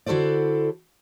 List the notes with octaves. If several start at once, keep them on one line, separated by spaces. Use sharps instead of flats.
D3 E4 F#4 A4 C5 D5